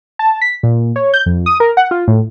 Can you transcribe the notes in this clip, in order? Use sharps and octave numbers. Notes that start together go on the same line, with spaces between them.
A5
B6
A#2
C#5
G6
F2
D#6
A#4
F#5
F4
A2